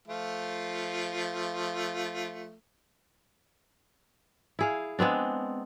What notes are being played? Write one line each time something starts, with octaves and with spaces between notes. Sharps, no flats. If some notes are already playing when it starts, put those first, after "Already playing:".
F3 A3 F4
E4 G#4 F5
G#3 B3 C4 D4